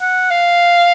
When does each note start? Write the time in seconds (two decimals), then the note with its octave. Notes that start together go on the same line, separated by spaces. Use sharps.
0.01 F#5
0.31 F5